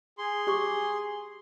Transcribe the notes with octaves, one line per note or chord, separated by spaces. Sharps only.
G#4 C6
G4 C#6 D6